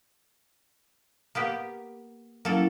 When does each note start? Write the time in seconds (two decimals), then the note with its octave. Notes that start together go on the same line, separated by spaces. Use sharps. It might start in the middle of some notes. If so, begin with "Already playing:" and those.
1.35 A#3 B3 G4
2.45 F#3 A#3 C#4 E4 A4